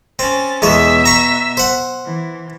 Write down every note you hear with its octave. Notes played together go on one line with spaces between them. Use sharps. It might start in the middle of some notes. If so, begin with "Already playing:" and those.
C4 C#4 A6
E2 B2 G#3 C#5 E5 E6
A#5 C#6
C5 F#5
E3